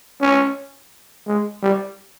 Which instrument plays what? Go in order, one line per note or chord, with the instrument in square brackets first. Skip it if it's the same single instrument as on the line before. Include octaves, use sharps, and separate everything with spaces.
[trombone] C#4
G#3
G3